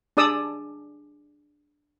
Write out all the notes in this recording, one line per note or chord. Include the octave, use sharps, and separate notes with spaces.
D4 G#4 D5 D#6 E6